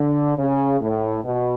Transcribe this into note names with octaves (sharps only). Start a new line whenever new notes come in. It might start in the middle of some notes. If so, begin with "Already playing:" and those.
Already playing: D3
C#3
A2
B2